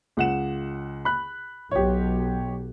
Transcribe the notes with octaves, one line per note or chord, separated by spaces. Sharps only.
C#2 F#5 E7
B5 F#6
B1 G4 C#5